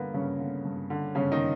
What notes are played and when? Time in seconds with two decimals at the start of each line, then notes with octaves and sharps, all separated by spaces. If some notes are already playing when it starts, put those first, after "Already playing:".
Already playing: G2 D3 A#3 B3
0.14 G2 C#3 C#4
0.40 D3
0.65 G2
0.90 D3
1.15 G2 C#3 C#4
1.32 D#3 D#4